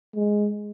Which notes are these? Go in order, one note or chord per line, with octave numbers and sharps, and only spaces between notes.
G#3